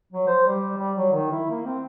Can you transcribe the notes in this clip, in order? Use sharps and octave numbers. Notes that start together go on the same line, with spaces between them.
F#3
C5
G3
G3
F#3
D#3
E4
A#3
C4